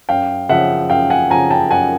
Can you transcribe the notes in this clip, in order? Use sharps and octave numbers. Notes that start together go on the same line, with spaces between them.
F#2 F5 G5
C#3 F3 E5 F#5
F#2 F5 G5
F#5 G#5
C#3 F3 G#5 A#5
G5 A5
F#2 F#5 G#5